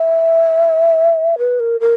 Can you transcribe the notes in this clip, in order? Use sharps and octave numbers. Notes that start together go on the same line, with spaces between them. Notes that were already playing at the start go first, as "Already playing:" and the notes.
Already playing: E5
B4
A#4
A#4